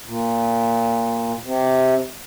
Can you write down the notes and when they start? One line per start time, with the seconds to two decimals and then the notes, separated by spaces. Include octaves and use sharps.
0.07 A#2
1.43 C3